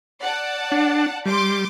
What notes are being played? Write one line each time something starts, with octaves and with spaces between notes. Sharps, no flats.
D5 F#5 A5
D4
G3 C6 D6